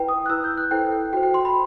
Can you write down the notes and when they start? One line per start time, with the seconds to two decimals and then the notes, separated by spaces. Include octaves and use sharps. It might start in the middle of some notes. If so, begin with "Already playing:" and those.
Already playing: E4 B4 G5
0.08 D#6
0.26 F#6
0.29 E4 B4 E6
0.44 G6
0.57 F#6
0.71 E4 A4 C5 G5
1.13 F#4 C5 G5
1.23 G5
1.34 C6
1.45 B5